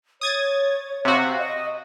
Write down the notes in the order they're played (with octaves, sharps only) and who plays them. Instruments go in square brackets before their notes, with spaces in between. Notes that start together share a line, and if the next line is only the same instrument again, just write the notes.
[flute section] C#5 [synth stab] D#6 G#6 A6
[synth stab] C3 F#4 [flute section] F5
[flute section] D#5